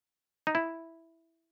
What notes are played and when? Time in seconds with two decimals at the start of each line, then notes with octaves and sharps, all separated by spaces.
0.47 D#4
0.55 E4